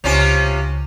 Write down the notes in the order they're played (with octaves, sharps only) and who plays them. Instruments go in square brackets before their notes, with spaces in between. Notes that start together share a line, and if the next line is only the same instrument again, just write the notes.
[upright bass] C#2 [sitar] C3 C#4 F4